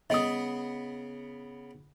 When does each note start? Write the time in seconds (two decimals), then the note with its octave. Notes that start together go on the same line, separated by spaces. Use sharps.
0.10 C#3 B3 D#5 D#6